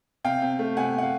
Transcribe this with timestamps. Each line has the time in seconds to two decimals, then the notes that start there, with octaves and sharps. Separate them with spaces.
0.24 C3 F5 G5
0.42 C3
0.59 A3
0.77 C3 F#5 G#5
0.95 C3 F#5
1.03 F5